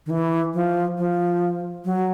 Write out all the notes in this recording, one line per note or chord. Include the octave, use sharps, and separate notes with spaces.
D#3
E3
F3
F3
F#3